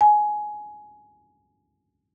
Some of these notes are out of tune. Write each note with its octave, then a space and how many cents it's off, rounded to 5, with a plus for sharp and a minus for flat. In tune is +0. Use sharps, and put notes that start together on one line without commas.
G#5 +15